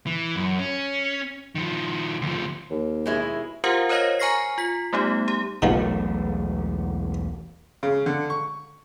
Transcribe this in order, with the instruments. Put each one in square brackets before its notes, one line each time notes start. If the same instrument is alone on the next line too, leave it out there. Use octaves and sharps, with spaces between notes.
[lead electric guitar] E3
F#2
C#4
D#3 F3
D2 F3
[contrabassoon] D#2
[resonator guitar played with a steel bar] B2 G#3 E4
[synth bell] F4 G4 A#4 C5 F5 F#5
A#4 C5 C#5 D#5 F5 A#6
G#5 A#5 C#6 F6 A#6 C7
F4 B6
G3 A3 B3 D#4 G4
G4
[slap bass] E1 B1 A3 [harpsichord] G#2 B2 F3
[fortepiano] C#3
D3
C#6